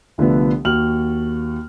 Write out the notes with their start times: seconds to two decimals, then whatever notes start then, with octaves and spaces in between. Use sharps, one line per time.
0.18 C2 D3 F3 A3 B3
0.65 D#2 F#4 F6 F#7